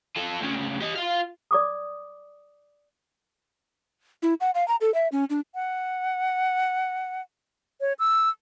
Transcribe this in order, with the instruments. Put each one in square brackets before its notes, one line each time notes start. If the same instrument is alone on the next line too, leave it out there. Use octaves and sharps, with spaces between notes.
[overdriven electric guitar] F4 A4
D2 C#3
G4 D#5
F4 F5
[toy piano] D5 D6 D#6
[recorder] E4
F#5
F5
A#5
A4
E5
C#4
D4
[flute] F#5
C#5
E6